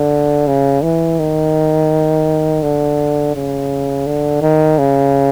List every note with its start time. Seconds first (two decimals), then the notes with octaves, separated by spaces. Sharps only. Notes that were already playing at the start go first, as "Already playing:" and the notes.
Already playing: D3
0.47 C#3
0.83 E3
1.19 D#3
2.63 D3
3.35 C#3
4.06 D3
4.42 D#3
4.78 C#3